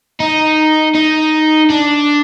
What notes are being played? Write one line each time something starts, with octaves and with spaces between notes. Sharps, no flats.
D#4
D#4
D4